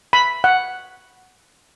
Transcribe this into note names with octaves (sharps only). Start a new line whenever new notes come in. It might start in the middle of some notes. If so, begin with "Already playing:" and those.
B5
F#5